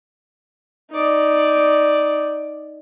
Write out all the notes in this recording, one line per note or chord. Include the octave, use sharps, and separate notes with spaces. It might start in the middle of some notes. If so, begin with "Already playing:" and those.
D#4 D5